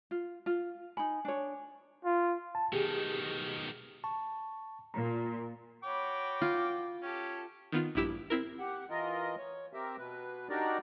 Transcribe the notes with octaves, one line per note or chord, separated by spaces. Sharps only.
F4
F4
D#4 G#5 B5
D4 C#5
F4
A5
B2 D#3 G4 G#4
A5 C#6
A#2 A#5
F#4 C#5 G5 B5 D6
F4
C#4 G4 A4
D#3 B3 F4
A#1 G2 E4 G4 E6 B6
C4 E4 A#4
G4 F#5
E3 F4 A#4 D#5
C#5
C4 G4 A#4 E5
B2 B4
D4 D#4 F#4 G4 A#4 D5